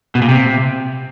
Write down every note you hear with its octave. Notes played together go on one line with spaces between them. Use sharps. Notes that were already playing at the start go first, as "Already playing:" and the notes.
B2
A#2
C3